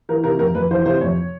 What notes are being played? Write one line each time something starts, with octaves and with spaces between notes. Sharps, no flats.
E3 A#4
C3 A#4
F2 A#4
F2 B4
E3 C5
C3 C5
F2 C#5